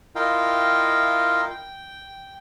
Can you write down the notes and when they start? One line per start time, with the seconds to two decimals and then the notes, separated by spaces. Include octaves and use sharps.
0.15 E4 F4 A#4 D#5 F5 G5
1.50 G5